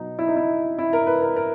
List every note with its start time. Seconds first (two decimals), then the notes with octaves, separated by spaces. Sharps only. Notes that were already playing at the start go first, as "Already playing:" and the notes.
Already playing: B2 F#3 D#4
0.19 E4
0.28 D#4
0.36 E4
0.79 E4
0.93 A#4
1.07 B4
1.22 A#4
1.36 A#4